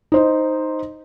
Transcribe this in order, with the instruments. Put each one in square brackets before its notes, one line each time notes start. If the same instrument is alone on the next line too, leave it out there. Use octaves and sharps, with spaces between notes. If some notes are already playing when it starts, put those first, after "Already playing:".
[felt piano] D#4 C5 D#5